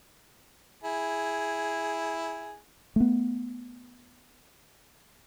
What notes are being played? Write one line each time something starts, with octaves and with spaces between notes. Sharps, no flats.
E4 G#4
A3 B3